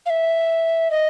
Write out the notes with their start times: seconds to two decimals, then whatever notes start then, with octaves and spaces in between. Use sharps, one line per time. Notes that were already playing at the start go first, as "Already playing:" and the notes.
0.06 F5
0.10 E5
0.91 D#5